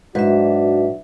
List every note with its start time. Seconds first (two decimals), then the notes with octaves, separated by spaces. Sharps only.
0.15 G#2 F#3 D4 F#4 B4 E5